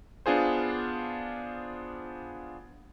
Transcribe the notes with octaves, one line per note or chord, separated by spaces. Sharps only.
B3 D4 F4 G#4 C5